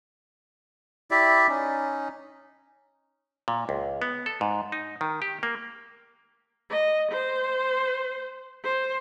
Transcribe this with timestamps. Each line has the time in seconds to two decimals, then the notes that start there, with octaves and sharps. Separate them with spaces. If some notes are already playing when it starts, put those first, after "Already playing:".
1.11 E4 G4 D5 E5
1.49 C#4 D#4
3.48 A#2
3.69 C#2
4.02 B3
4.26 A4
4.41 G#2
4.72 D#4
5.01 D#3
5.22 G4
5.43 A#3
6.71 D#5
7.12 C5
8.64 C5